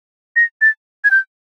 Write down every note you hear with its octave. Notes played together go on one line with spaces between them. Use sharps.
A#6
A6
G#6
G6